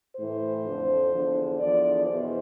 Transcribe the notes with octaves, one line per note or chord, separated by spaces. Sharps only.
A2 E3 C5
F2 D3 F3
E2 D3 F3
E2 D3 F3 D5
E2 B2 C5